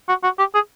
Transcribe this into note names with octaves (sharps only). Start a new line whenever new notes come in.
F#4
F#4
G4
G#4